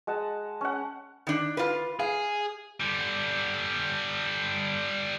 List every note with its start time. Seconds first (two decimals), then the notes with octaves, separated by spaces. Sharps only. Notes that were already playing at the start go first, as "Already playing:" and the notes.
0.07 G#3 F#5 A5
0.61 C#4 F#5
1.27 D#3 D4
1.57 F4 B4
2.00 G#4 F5
2.80 D3 G3